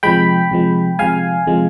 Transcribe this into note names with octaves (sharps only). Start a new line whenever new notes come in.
C3 F3 G#3 G5 B5
C3 F3 G#3
C3 F3 G#3 F5 G#5
C3 F3 G#3